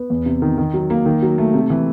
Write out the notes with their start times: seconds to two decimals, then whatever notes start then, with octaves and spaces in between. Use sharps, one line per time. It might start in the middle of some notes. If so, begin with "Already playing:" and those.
Already playing: B3
0.10 E2
0.26 C3
0.42 D#3
0.58 D#3
0.74 F#3
0.90 A#3
1.06 D#3
1.22 F#3
1.38 A3
1.54 C3
1.70 E3